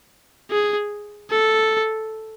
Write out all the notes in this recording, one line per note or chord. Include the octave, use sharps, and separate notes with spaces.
G#4
A4